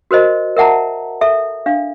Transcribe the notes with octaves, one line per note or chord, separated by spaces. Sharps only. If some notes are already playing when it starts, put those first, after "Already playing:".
F#4 A#4 C5 D#5
A#4 E5 F#5 A5 A#5
A4 E5
D4 F5